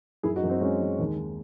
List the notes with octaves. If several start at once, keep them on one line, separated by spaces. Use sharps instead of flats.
F#2 E4 G#4
D#4 F#4
F#2
C4 D#4
G#3 C#4
G#3
D#2
D#3